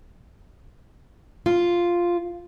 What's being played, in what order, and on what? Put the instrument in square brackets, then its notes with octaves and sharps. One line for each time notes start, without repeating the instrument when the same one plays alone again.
[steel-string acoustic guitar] F4